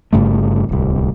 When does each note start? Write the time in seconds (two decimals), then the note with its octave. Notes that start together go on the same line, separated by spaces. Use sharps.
0.13 G1 G2 C#3 A3
0.69 D1 C2